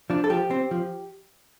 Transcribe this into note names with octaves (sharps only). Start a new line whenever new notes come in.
F3 D4
A4
F3 G4
C4
F3